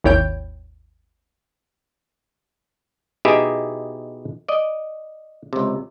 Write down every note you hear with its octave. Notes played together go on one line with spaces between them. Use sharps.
G#1 D#2 E4 C#5 G5 G6
B2 D#4 E4 G4 G#4 E5
D5 D#5
C#2 C3